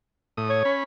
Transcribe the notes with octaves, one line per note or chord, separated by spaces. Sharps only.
A2 D#6
C#5
C#4 B5